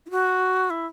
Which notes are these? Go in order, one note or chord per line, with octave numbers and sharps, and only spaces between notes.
E4
F#4
E4